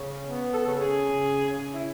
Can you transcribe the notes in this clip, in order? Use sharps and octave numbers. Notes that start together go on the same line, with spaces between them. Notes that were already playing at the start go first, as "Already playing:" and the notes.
Already playing: C#3
B3
A4
C#3
G#4
C#3
C#3
E4